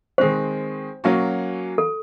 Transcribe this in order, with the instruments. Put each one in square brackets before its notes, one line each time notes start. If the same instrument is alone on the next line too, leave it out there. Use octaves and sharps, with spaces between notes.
[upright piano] D#3 G#3 C4 [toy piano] C5
[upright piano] F#3 A#3 C#4 F#4
[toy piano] A4